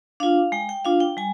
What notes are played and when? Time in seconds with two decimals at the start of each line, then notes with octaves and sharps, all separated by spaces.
0.20 D4 F4 F5
0.52 G#3 G5
0.69 G5
0.85 D4 F4 F5
1.00 G5
1.17 G3 G#5